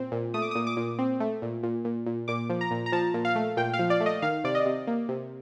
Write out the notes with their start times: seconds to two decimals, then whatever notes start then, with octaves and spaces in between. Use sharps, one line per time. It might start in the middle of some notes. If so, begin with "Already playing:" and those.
Already playing: A#2 C4
0.12 A#2
0.34 A3 D#6
0.42 D6
0.51 A#2 D#6
0.67 D6
0.77 A#2
0.99 C4
1.20 A3
1.42 A#2
1.63 A#2
1.85 A#2
2.06 A#2
2.28 A#2 D6
2.50 F3
2.61 A#5
2.71 A#2
2.86 A#5
2.92 F3 A5
3.14 A#2
3.25 F5
3.36 A3
3.57 A#2 G5
3.73 F5
3.79 F3
3.90 D5
4.00 A3
4.06 D#5
4.22 D#3 F5
4.44 C3 D5
4.55 D#5
4.65 C3
4.87 A#3
5.09 C3